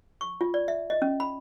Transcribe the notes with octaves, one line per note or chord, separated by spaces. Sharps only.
C#6
F4
D5
E5
D#5
C#4
B5